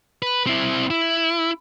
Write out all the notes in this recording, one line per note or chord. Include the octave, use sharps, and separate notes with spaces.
B4
C4 E4
E4